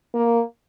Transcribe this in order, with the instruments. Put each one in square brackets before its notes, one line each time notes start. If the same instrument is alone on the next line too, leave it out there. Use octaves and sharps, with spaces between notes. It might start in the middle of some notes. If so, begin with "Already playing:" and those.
[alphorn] A#3